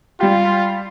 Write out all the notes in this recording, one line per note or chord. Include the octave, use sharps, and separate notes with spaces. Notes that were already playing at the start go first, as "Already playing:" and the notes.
G3 F4 G4